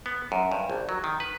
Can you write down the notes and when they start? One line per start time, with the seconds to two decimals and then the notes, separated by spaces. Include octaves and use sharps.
0.06 B3
0.32 F#2
0.52 G2
0.70 A#1
0.89 F#3
1.04 D#3
1.20 B4